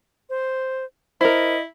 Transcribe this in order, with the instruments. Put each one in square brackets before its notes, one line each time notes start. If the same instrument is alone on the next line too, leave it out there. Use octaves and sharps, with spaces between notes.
[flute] C5
[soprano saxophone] E4 [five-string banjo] A#4 C5 [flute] D#5